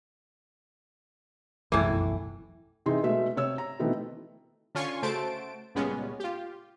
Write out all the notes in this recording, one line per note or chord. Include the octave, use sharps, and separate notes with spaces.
F1 B1 F#2 A2 E3
C3 E3 D#4 G#4 C6
B2 G#3 A3 E5
C3 C#5 E6
A#5
B2 D#3 E3 A3 B3 C4
D3 C#4 F4 G#5 C6 C#6
C#3 A3 F#4 C5 A5 D7
C#2 A#2 G3 G#3 B3 C#4
F4 G4